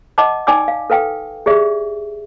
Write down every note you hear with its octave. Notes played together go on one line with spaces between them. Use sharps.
D#5 F#5 A5 D6
D#4 D5 G5 G#5 D6 E6
F5
A4 B4 F5 G5
G4 G#4 D5 E5